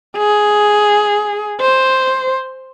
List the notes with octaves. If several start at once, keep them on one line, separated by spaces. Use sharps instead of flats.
G#4
C5